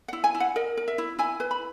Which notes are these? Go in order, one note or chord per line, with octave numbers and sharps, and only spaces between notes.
F#5
E4
G#5
E4
F#5
A#4 D#5
A#4
E5
E4
E4 G#5
B4
B5